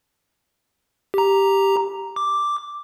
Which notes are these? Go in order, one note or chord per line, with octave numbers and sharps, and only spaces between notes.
G4 A#5
D6